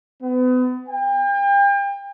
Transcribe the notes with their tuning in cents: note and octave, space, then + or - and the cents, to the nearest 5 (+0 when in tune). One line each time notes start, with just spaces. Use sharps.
B3 +35
G5 +35